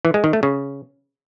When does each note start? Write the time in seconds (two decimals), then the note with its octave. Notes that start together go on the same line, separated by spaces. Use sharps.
0.05 E3
0.14 G#3
0.24 D#3
0.33 A3
0.43 C#3